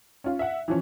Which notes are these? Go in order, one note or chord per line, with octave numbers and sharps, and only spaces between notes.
C#4 F4
E5 F#5
E3 F3 C#4